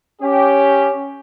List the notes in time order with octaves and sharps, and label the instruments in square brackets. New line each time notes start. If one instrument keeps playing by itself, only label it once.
[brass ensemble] C#4 G4